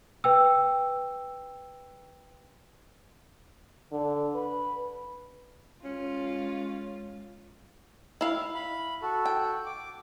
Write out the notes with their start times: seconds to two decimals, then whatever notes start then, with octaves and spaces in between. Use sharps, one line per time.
0.24 B4 G5 E6
3.92 D3
4.35 B4
5.85 G#3 C#4 F4
8.21 E4 F5
8.55 B5
9.02 F#4 A4
9.26 G5
9.66 D6